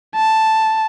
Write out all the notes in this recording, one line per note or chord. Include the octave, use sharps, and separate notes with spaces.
A5